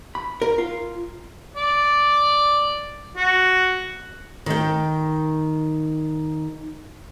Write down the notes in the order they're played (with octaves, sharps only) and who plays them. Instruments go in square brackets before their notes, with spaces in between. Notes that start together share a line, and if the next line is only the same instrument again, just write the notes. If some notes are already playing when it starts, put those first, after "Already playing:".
[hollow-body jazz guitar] B5
A#4
F4
[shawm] D5
F#4
[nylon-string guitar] D#3 G5